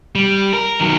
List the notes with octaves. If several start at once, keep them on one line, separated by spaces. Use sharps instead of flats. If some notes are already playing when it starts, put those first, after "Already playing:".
G3
A#4
D#3 F#3